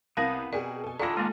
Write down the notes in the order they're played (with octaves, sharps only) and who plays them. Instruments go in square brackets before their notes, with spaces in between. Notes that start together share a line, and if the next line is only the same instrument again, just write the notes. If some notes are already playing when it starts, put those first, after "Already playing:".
[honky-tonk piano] C2 D#6 D#7 [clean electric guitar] B3 [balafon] C4 A#4 F5
[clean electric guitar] B2 [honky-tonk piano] G4 G#4 A#4 [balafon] D5
[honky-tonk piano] A4 G#5
[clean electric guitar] D#3 D4 E4 [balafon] F4 D5 [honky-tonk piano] A4 F5 A#6
[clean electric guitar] D#3 D4 F4 [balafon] G#3 A#3